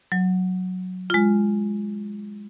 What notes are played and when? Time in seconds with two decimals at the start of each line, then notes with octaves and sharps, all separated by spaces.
0.12 F#3
1.10 G#3 F4